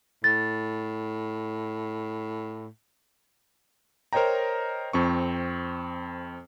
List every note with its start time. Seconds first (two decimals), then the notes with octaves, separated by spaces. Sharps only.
0.24 A2 A6
4.13 A#4 C5 C#5 D#5 G5 A#5
4.93 F2 C4 C#6